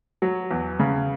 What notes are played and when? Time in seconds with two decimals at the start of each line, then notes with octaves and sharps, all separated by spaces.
0.22 F#3
0.51 E2
0.79 C#3